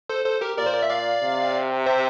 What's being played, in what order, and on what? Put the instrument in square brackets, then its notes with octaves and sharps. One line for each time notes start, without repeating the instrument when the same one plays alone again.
[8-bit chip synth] A4 C5
A4 C5
G4 A#4
[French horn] A#2 [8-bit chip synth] A#4 D5
[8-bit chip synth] C5
D5
E5
D5 F5
[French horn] C3
[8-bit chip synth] C5 E5